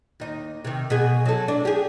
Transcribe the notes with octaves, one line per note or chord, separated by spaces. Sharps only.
D#2 D#4
C3 D#3
B2 G#4
F#3 A4
D4
G4 G#4